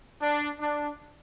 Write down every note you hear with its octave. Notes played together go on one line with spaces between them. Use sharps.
D4
D4